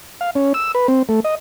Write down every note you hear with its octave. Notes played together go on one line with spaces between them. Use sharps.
F5
C#4
E6
B4
C4
A3
D#5